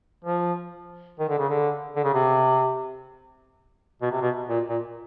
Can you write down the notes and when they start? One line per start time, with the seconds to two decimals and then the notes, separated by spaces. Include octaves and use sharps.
0.24 F3
1.19 D#3
1.29 D3
1.39 C#3
1.49 D3
1.96 D3
2.04 C#3
2.14 C3
4.02 B2
4.12 C3
4.21 B2
4.49 A#2
4.69 A#2